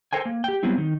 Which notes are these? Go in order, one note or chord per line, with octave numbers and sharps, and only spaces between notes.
A4 A#4 C5 G5 G#5
A#3
G4 G5
F#3 G3 B3 C4 E4
D#3 D#4